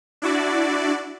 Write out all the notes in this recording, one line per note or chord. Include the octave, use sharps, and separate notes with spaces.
D4 E4 F#4 D5